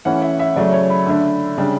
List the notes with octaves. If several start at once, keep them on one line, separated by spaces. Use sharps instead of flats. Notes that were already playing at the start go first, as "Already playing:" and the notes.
E3 A3 C#4 F#5
E5
E5
C#3 F#3 A3 D5
C#5
B5
D3 A3 D4
C#3 G3 D4